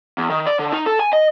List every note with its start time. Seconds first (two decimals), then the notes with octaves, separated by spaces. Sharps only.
0.18 E2
0.30 D#3
0.47 D5
0.59 D3
0.73 D#4
0.86 A4
0.99 G#5
1.13 D#5